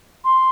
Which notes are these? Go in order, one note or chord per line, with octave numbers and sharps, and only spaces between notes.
C6